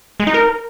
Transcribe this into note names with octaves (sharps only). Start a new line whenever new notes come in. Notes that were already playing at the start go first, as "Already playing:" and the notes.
G#3
D#4
A#4